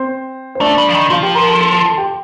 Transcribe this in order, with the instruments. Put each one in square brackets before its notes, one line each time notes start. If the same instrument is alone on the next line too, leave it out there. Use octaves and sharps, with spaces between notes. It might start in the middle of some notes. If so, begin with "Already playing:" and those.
Already playing: [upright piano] C4 C5
C5
[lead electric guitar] A3 [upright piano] D4 D5
[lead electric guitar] G3
F3
D#3
[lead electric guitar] F3 [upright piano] F4 F5
[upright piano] G4 G5
A#4 A#5
A4 A5
A4 A5
A4 A5
A4 A5
G4 G5